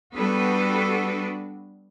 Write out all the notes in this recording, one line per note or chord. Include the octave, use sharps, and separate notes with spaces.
G3 B3 D4 F#4 A4 B4